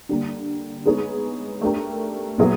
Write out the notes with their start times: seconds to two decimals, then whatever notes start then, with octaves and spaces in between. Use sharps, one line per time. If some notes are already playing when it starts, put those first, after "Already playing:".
0.09 D3 G3 A#3
0.86 G#3 B3 D#4 G#4 C#5
1.61 A3 D4 G4 A#4
2.38 A#2 F#3 B3 E4 G#4